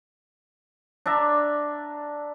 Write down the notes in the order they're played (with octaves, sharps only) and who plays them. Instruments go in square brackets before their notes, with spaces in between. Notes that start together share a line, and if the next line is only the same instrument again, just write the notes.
[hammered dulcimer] D4 D5 E5 A#5